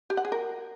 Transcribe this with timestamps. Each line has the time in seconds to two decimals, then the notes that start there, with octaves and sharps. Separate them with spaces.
0.10 G4
0.17 F#5
0.25 G#4
0.32 A#4